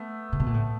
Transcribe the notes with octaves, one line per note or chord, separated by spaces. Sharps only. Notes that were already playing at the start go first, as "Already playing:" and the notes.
Already playing: A3 B3
C3
B2
A#2
A2